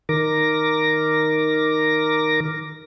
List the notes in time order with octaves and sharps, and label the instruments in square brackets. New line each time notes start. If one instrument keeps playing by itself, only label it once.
[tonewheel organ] D#3 A#4 D6 A#6